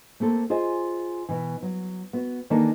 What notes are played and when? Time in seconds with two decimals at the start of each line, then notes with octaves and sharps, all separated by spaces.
0.20 A3 A#3 C4 A4
0.50 F4 G#4 C5 D#5 G#5
1.29 B2 E3
1.62 F#3
2.13 B3 F#4
2.50 D#3 E3 A#3 D4 A4 A5